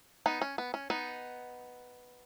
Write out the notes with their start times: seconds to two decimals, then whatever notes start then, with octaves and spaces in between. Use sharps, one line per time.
0.26 B3 D#4
0.41 C#4
0.58 B3
0.74 C#4
0.90 B3 D#4